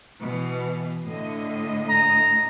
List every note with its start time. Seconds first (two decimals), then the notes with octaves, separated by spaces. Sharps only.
0.24 B2 E3
1.07 A2 D3 D#5
1.90 A#5